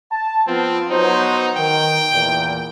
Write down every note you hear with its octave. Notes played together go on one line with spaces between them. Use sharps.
A5
F3 B3 C4 F4
F#3 B3 D#4 C5
D#3 G5
E2 A#2